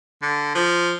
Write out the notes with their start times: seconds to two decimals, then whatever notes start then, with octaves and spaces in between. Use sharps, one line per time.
0.23 D3
0.55 F3